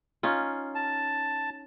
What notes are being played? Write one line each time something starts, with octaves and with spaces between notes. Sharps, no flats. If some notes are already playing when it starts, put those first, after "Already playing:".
C#4 D#4 F4
A5